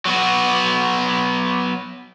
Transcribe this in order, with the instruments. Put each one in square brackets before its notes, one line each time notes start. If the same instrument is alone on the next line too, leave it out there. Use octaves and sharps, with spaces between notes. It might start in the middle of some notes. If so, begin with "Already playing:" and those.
[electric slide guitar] F#3 B3 F#4